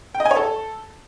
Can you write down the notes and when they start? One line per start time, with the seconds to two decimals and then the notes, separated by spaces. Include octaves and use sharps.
0.15 G5
0.20 D#5
0.25 G#5
0.31 C#5
0.36 A4